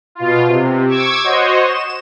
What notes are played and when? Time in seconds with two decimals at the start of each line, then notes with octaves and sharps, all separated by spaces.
0.15 B2 F4
0.48 C3
0.88 C#6 D6 E6 G#6
1.23 F#4 C5 C#5 D#5
1.66 E7